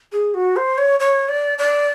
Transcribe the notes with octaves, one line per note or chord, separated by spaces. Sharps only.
G#4
F#4
C5
C#5
C#5
D5
D5